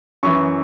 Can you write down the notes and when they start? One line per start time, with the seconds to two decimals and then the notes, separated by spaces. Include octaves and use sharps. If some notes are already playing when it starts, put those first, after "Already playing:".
0.23 F#2 E3 C#6